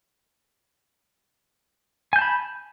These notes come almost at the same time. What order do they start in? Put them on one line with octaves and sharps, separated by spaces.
G#5 G6 A5 B5